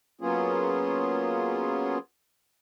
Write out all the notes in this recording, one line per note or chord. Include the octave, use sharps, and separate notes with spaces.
F#3 A#3 B3 C#4 F4 G#4